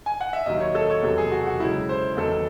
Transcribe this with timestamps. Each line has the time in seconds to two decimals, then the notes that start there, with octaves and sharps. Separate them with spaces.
0.06 G#5
0.21 F#5
0.33 E5
0.46 D#2 D#3 F#3 D#5
0.60 C#5
0.75 A4
0.90 C#5
1.03 E2 C3 F#3 A4
1.18 G#4
1.32 F#4
1.47 F#4
1.60 C#2 C#3 F#3 E4
1.89 C5
2.17 E2 D#3 F#3 A4